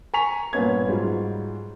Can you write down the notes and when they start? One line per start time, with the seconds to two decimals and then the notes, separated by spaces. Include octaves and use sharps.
0.14 G#5 A#5 C#6 B6 F7
0.53 G2 A#2 B3 C#4 G#6
0.88 G#2 F#3 G3 F4